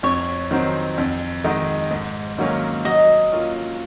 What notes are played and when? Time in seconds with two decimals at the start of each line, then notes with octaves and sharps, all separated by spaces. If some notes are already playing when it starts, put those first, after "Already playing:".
0.03 F2 C#5
0.51 D#3 F#3 C4
0.98 F2
1.44 D#3 G#3 D#4 F#4
1.91 G#2
2.38 D#3 F#3 A#3 C#4
2.85 F#3 D#5
3.32 A#3 C#4 F4